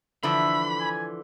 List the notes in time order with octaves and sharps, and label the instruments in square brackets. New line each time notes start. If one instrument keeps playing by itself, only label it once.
[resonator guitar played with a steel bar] D3 E3 F3 [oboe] E5 [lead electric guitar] B5
[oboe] G#5